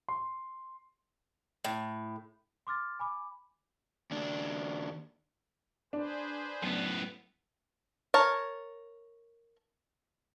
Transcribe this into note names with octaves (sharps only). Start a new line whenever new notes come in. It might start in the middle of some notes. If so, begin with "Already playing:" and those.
C6
A2
C6 D6 F6 A6
G#5 B5 D6
D#2 D4
D4 G#4 B4 C5
F#2 A2 B3
A#4 C#5 A5